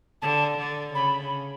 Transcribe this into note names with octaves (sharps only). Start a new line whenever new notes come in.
D3 A5
D3
C#3 B5